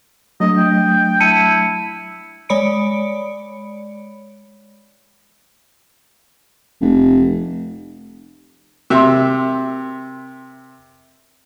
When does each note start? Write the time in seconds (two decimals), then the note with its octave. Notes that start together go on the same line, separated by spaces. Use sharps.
0.40 F#3 A3 D4 D#5
0.58 G5
1.20 E4 A5 C#7 D#7
2.49 G#3 C#5 D5 B5 C#7 D7
6.81 F1
8.90 C3 A#4 E5 G5 C6